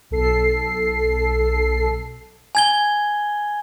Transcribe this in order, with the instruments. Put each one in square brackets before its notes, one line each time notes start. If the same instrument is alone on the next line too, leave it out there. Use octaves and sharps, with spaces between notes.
[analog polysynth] B1 A4 C7
[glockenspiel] G#5 G#6 G7